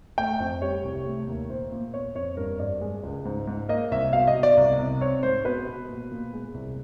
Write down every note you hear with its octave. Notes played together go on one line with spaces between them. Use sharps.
A3 G5
F2
G3 C#5
C2
A3
D#2
A#2 C5
A#2
B3 C#5
F2 C#5
G2 A#4
G2 D5
G#3
C#2
G#2
G#2
A#3 D#5
C2 E5
B2 F5
D#5
B2
D5
C2
C2
C4 C#5
G#2 C5
B2 B4
B2
A#2
A#2
G#3
C2